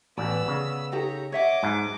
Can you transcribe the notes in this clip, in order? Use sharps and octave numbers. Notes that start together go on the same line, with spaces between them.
A1 B3 D5 E6
C#3
D#4 G4 A4 C#5 A#5
C#5 D#5 E5 F#5 D6
G#2 A5